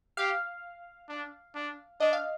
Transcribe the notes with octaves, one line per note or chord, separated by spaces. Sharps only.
G4 F5
D4
D4
D4 D#5
F5